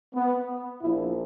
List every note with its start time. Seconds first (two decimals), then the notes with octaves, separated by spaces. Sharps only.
0.15 B3
0.82 A#1 A#2 F3 E4